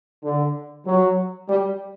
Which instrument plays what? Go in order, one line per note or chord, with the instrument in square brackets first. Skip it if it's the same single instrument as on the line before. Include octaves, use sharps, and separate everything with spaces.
[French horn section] D3
F#3
G3